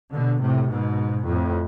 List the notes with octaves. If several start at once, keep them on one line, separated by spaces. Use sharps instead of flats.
B2 D3
A2 C3
G#2 B2
F2 A2